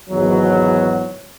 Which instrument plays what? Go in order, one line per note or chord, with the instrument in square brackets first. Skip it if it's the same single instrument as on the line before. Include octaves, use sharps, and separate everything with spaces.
[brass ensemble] G#1 E2 G#2 F#3